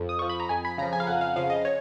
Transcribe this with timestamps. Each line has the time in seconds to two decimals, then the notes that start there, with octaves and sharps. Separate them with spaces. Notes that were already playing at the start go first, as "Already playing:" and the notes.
Already playing: F2 F3
0.09 D#6
0.19 F3 C#6
0.29 B5
0.40 A#5
0.49 F2 G#5
0.65 B5
0.78 C#3 F3 A#5
0.93 G#5
1.00 F5
1.07 F2 F#5
1.21 F5
1.36 C#3 F3 F5
1.50 D#5
1.65 C#5